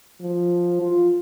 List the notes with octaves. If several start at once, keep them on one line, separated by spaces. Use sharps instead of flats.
F3
F4